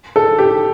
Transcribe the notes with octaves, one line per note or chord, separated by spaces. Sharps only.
A4
G4